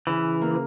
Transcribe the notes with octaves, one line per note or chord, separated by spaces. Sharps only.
C#3 E3
A#3